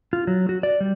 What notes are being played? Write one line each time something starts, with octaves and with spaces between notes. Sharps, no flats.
F4
F#3
F#4
D5
G3